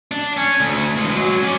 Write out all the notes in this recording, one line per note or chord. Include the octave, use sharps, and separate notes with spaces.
D4
C#4
D2
E2 G#3
F#3 G#3
C#4 D5